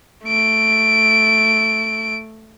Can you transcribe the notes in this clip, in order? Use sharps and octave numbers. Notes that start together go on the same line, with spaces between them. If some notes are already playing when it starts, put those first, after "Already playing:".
A3 D7